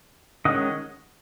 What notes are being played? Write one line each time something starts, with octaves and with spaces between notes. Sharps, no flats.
D#3 G#3 C#4 D#5 F#5